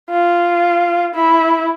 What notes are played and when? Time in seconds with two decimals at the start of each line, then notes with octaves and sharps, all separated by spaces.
0.10 F4
1.15 E4